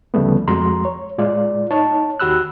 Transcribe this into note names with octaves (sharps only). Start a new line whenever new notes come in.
D2 C#3 F3 G3 A3 B3
F2 G#3 F#4 A#5 C6
C#5
A2 G#3 F4 D5
D#4 C#5 A5
D#2 F#4 G4 B5 E6 F#6